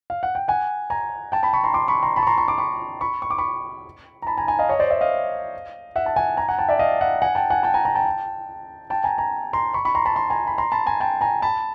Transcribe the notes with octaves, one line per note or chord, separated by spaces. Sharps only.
F5
F#5
G5
F#5 G#5
G#5 A#5
G5 A5
A5 B5
B5 C#6
A#5 C6
C6 D6
B5 C#6
A#5 C6
A5 B5
C#6
A#5 C6
B5 C#6
C6 D6
B5 C#6
B5 C#6
C#6
D6
B5 C#6
A#5
A5 B5
G#5 A#5
G#5 A#5
D#5 F5
C#5 D#5
C5 D5
D5 E5
D#5 F5
E5 F#5
A5
F#5 G#5
G#5 A#5
F#5 G#5
G5 A5
D5 E5
D#5 F5
E5 F#5
F#5 G#5
G5 A5
F#5 G#5
G5 A5
G#5 A#5
G#5 A#5
G5 A5
G5 A5
G#5 A#5
G#5 A#5
A#5 C6
B5 C#6
B5 C#6
A#5 C6
A5 B5
A#5 C6
G#5 A#5
B5
A#5 C6
A5 B5
G#5 A#5
G5 A5
G#5 A#5
A5 B5